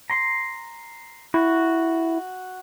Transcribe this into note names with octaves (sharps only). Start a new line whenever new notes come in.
A#5 C6
E4 F#4